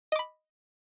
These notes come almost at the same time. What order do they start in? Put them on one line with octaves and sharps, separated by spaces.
D#5 D6 B5